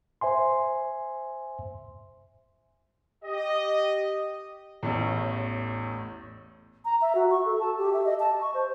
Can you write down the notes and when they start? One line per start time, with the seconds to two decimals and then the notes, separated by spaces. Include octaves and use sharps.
0.21 C5 E5 G#5 C6
3.24 G4 D#5
4.83 A1 E2 A2
6.85 A#5
7.02 E5
7.15 F#4
7.31 C#6
7.45 A4
7.60 A5
7.78 G4
7.93 E5
8.06 D#5
8.20 A5
8.41 C#6
8.54 C5